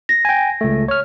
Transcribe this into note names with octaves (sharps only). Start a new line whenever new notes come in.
A#6
G5 G#5
C#2 A3
C#5 F6